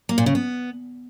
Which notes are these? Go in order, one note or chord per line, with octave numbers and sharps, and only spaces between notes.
A#3
A#2
C#3
B3